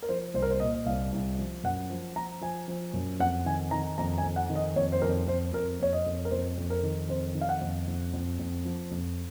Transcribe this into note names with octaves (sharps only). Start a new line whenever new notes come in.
A#4
F3 C5
C2 C5
A#4
C5
A#2 D#5
D#5
C2 F5
C2
F3
F#2 F#5
F3
F3 A#5
F3 G#5
F3
F#2
F2 F#5
D#3 G#5
D#3 A#5
F2 A#5
G#5
F2
F#5
D#3
D#5
F2 C#5
C5
F2 A#4
F2 C5
F2 A#4
F2 C#5
D#5
F2
A#4
F2 C5
F2
A#4
D#3
F2 C5
D#3
F5
F#5
F2
F2
F2
F2
F3
F2